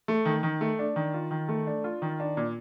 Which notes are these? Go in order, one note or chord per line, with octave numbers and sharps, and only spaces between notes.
A3
D#3
D#3
A3
D4
D#3
F4
D#3
A3
D4
F4
D#3
D4
A#2